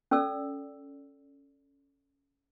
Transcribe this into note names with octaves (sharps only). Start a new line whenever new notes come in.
C#4 A4 D5 E6